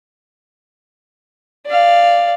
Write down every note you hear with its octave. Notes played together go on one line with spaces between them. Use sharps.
D5 F5